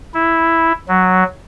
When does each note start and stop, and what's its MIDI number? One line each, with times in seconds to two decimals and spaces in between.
0.14 0.72 64
0.88 1.23 54